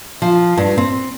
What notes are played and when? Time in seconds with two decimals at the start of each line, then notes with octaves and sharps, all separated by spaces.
0.22 F3
0.57 G2
0.78 C4